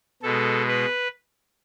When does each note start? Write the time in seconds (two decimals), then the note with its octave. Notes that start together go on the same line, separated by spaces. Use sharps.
0.23 B2 G#3 A4
0.68 B4